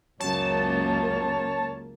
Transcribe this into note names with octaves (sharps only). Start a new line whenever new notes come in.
C#2 F#2 C#3 A#3 C#5 A5